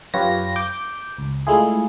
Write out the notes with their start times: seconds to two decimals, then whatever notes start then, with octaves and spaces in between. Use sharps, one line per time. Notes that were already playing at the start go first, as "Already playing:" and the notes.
0.14 F#2 F4 G4 B4 C#5 A#6
0.56 D6 G6
1.18 C#2
1.47 G#3 A3 E4 F4 G#4